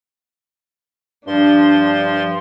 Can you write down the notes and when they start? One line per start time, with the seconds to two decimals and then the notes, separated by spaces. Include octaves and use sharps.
1.27 G2 F3 D4 C6